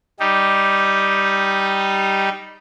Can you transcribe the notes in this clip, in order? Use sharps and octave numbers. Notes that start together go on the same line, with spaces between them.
G3 D#4 G4